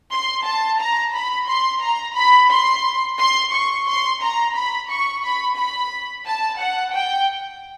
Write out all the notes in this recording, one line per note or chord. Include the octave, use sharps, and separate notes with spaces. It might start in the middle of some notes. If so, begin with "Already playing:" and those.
C6
A5
A#5
B5
C6
A#5
B5
C6
C6
C#6
C6
A#5
B5
C#6
B5
B5
A5
F#5
G5